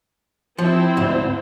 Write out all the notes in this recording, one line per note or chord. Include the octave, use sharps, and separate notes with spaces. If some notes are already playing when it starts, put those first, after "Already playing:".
F3 C4 E4 C5
D2 G#2